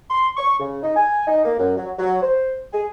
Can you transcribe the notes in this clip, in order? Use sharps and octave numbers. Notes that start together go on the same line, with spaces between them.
C6
C#6
C#3
D#4
G#5
D#4
A#3
F#2
F#3
F#3
C5
G#4